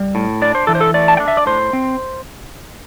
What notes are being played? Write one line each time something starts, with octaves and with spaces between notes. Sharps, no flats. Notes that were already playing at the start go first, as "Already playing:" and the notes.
Already playing: G3
A2
D4 D5
C5
E3 A4
C5
A4
A3 D5
A5
G5
D4
E5
D5
A2 C5
C4